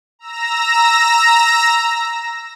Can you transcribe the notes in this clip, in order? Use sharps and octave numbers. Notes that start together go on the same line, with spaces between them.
A#5 E6 A#6